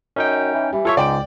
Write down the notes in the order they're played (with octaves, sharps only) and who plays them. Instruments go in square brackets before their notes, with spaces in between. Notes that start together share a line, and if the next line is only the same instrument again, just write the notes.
[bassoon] F#2 [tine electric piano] C#4 D#4 G5
[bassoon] E3
[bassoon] E3 [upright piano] G3
[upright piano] F4 C#6 [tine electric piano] A4 C#5 E5
[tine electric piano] C#2 [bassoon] G#2 [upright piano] D5 G5 D7